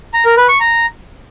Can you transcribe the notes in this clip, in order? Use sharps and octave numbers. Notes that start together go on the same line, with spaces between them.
A#5
A#4
B4
C#6
A#5